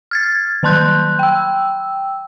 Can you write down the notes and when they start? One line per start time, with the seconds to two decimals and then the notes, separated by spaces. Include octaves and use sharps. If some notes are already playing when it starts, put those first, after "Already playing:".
0.11 F6 G#6 A6
0.63 D#3 F#3 A5 C6 F#6 G6
1.19 G5 E6